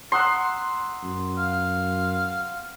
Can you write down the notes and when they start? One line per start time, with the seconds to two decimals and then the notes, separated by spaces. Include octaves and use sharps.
0.12 E5 F#5 A#5 C6 D#6 F#6
1.03 F#2
1.38 F5